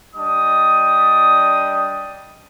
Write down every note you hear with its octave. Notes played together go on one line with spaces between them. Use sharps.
G3 D4 D#5 D#6